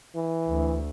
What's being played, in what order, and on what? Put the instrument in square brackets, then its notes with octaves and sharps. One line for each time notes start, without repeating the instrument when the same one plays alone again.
[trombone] E3
[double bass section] D2